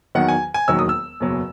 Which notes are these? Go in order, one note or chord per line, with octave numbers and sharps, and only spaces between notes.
E2 D#3 F#3 F#5
G#5
G#5
E1 D#2 D#3 F#3 E6
D#6
E6
F#1 E2 B2 F#3